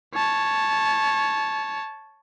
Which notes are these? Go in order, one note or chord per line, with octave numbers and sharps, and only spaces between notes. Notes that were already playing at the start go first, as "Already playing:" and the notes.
C#5 A5